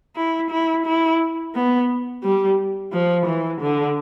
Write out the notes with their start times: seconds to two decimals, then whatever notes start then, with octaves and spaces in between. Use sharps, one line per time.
0.16 E4
0.50 E4
0.86 E4
1.55 B3
2.23 G3
2.92 F3
3.26 E3
3.61 D3